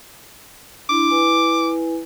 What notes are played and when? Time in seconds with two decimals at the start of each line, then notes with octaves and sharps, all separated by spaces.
0.89 D4 E4 C6 D6
1.10 E4 B4 G#5